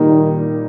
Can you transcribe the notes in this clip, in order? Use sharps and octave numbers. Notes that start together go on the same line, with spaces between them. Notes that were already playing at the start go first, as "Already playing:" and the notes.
Already playing: A#2 D#3 G3 A#3 D#4